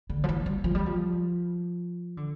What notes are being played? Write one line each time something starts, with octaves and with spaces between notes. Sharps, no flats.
D3
F3
E3
G3
F3
G3
F3
D3